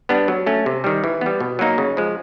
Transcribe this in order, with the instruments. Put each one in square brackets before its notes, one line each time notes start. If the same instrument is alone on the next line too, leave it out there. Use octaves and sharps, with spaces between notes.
[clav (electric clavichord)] G3 B3 D4
F#3
A3 C#4
C3
D#3 G3
E3
G3 B3
B2
F#3 A#3 D#4
C#3
F3 G#3